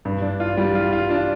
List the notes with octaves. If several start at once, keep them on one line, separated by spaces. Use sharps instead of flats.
G2
D4
F4
G3
F4
F4
D4